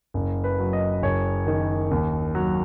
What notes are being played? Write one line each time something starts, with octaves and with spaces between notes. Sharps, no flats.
F#1
B4
F#3
D#5
F#1 C#5
D#3
D#2
F#3